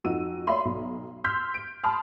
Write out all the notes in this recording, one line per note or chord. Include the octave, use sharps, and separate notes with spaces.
F2 D#4 F#4 E6 D#7
C#5 D5 E5 F5 B5 C6
B1
C6 E6 F6 G6 B6
D7
A5 B5 C6 D#6 F6